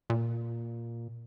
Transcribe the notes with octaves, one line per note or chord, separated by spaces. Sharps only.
A#2